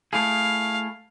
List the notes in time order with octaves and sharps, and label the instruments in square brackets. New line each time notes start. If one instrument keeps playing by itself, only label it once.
[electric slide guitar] A3 E4 G#4 [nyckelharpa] F5